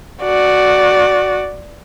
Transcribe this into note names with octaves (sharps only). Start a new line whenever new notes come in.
F#4 D5